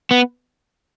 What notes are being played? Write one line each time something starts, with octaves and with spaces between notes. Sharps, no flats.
B3